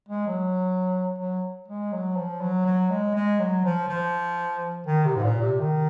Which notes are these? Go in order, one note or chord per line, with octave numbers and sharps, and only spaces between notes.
G#3
F#3
F#3
G#3
F#3
F3
F#3
F#3
G#3
G#3
F#3
F3
F3
D#3
C3
G#2
A#2
C3
D#3